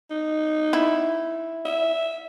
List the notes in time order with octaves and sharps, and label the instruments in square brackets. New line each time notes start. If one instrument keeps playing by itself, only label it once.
[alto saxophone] D#4
[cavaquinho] E4
[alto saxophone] E5